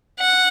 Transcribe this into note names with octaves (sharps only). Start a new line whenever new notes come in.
F#5